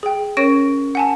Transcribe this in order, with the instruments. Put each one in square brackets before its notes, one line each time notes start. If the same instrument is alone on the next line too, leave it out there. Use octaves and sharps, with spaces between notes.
[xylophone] G#4 G5
[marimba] C#4 A#4 [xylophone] C#5 A#6 D7
[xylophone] F#5 G#5 A5